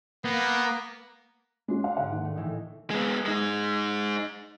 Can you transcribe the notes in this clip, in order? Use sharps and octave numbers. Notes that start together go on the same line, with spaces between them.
A#3 B3
G#3 C#4 D4 F#4 C6
D5 F5 F#5
G#2 D3 E5 F#5
D#2
A3
A2 E3 D#4
G#3 B3
G#3 D#4